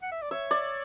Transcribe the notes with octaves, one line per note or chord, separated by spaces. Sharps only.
F#5
E5
D5
C#5 E5
D5